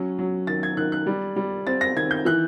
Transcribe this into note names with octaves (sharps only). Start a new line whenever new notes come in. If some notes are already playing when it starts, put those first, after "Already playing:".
Already playing: F#3 C#4
F#3
D#3 A6
G#6
D#3 F#6
F#6
G3
G3
C4 A6
A#6
D#3 G#6
G6
E3 F#6